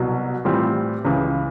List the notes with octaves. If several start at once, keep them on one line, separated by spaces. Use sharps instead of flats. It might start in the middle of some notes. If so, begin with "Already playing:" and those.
Already playing: C2 B2 F#3
A2 E3 G3 C4 F4
C#2 C#3 E3